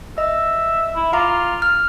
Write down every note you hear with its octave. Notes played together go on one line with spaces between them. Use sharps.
D#5 E5
E4
F4 F5 A#5 D6
F6